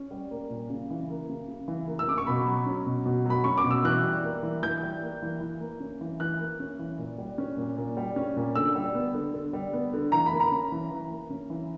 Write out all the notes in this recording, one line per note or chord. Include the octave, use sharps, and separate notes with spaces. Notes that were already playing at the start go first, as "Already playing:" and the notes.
Already playing: C#4
G3
A#3
A#2
C#3
E3
A#3
C#3
C#3
E3
A#3
E6
C#3 D6
C#6
B2 B5
F#3
C#4
B2
B2
F#3 B5
C#4 C#6
D6
B2
E6
E3 F#6
G3
A#3
E3
E3 G6
G3
A#3
E3
E3
A#3
C#4
E3
E3 F#6
A#3
C#4
E3
A#2
G3
C#4
A#2
A#2
G3
C#4
A#2
D3 E6
G3
B3
D3
D3
G3
B3
D3
E3 A#5
B5
A#3
A#5
C#4
E3
E3
A#3
C#4
E3